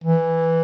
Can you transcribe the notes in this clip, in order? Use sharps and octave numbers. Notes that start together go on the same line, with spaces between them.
E3